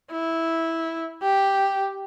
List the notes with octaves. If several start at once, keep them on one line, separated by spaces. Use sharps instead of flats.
E4
G4